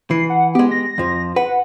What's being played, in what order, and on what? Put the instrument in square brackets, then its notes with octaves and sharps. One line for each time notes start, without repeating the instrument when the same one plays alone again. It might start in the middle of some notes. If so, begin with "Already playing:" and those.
[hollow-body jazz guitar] E3 [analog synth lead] C7
[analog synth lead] F#5
[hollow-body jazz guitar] G#3 G4 [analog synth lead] B3
[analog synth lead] A#6
[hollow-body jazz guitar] F2 F3
[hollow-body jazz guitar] B4 [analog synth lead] F#5